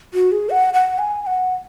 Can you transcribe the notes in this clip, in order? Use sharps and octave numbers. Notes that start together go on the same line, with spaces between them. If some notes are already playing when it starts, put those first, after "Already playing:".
F#4
G#4
F#5
F#5
G#5
G#5
F#5